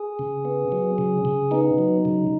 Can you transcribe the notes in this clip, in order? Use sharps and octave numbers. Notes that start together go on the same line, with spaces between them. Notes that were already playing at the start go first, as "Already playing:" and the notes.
Already playing: G#4
C#3
B3
F#3
C#3
C#3
B3 D#4
F#3
C#3